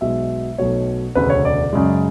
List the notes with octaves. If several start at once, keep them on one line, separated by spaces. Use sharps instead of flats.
B1 B2 G#3 E5
B1 B2 A3 C#5
E1 D2 C#3 B4
C#5
D5
F#2 C#3 G#3